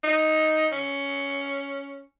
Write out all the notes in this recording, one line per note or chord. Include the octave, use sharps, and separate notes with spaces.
D#4
C#4